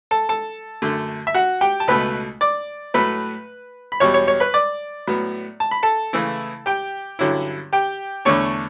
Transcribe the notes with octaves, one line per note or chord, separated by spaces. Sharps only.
A4 A5
A4 A5
F#2 D3 A3
E5
F#4 F#5
G4 G5
A5
C#2 B2 A3 B4 B5
D5 D6
A2 F#3 A3 B4 B5
B5
E2 B2 G3 C#5 C#6
C#5 C#6
C#5 C#6
B4 B5
D5 D6
A2 F#3 B3
A5
B5
A4 A5
C#3 E3 A3 E4
G4 G5
G2 D3 F#3 C#4 E4
G4 G5
E2 D3 A3 D4 C#5 C#6